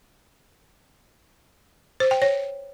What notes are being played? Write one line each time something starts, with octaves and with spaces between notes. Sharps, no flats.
C5
G5
C#5